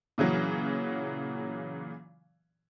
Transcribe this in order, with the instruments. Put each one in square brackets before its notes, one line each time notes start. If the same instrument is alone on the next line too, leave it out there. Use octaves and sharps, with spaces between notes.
[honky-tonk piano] A#2 C#3 E3 F#3